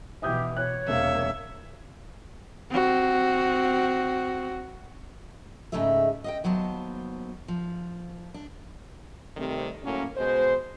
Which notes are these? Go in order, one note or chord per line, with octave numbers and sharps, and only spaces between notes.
B2 E3 G4 E5 D#6 G6
B2 C#5 F#6
E1 C3 A#3 E5 F5
C4 F#4
G#2 C#3 A3 D#4 G#4 E5
D#5 F5 G5
D#2 F#3 B3 C5 A5
F3
D4
C3 D#3 G3 A3 C4
A2 F#3 A#3 C#4
B2 G#3 C5